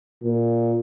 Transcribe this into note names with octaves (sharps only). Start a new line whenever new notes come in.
A#2